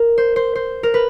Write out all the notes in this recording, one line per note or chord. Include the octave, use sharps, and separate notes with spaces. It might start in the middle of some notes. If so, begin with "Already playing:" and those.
Already playing: A#4
C5
C5
C5
A#4
B4